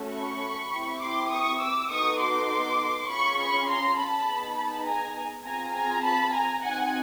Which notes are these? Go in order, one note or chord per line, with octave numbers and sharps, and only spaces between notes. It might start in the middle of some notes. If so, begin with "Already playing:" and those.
Already playing: A3 C#4 F#4 A4
B5 C#6
C4 E4 G4
C6 D6
C#6 D#6
D6 E6
B3 D#4 F#4 A4 C#6 D#6
C6 D6
C#4 F4 G#4 B5 C#6
B5 C#6
A#5 C6
A5 B5
B3 D#4 G#4
A5 B5
G#5 A#5
C4 F4 G#4 G#5 A#5
G#5 A#5
A5 B5
G#5 A#5
C4 D#4 F#4 F#5 G#5